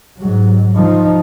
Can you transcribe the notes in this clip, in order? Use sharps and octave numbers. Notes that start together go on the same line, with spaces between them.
G#2 F#3
F3 D#4